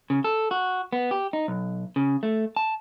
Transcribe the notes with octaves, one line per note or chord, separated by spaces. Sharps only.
C#3
A4
F#4
B3
G4
D#4
B1
C#3
A3
A5